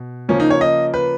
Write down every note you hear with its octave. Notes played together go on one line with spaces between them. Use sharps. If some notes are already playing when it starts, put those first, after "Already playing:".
Already playing: B2
C#3 F3 A#3 C#4
D#4
C#5
D#5
B4